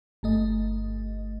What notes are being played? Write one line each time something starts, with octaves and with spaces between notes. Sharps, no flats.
G1 A3 D#5